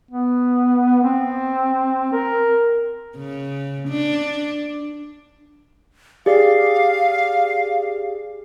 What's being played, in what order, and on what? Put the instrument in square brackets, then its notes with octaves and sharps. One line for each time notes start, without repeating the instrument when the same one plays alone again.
[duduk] B3
C4
A#4
[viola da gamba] C#3
D4
[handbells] G4 G#4 D5 [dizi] F5